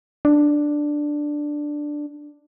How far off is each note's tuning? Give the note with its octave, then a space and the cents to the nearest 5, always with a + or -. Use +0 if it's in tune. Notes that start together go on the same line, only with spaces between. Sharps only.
D4 +5